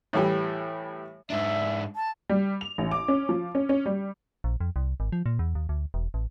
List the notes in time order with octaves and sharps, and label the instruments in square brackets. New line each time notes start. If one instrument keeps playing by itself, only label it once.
[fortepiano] A2 E3 G3
[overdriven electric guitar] G#2 D4 [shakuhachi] E5
[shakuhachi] A5
[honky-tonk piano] G3
F7
A1
D6
C#4
F3
C#4
C#4
G3
[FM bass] A#1
F2
C2
G#1
F3
A#2
E2
D#2
D2
E1
A1